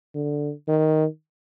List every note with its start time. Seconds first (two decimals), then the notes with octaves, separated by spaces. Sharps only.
0.14 D3
0.68 D#3